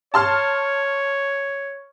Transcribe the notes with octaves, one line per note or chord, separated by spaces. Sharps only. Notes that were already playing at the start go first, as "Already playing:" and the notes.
C#5 A5 C6 F6